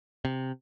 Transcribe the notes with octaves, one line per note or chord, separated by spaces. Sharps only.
C3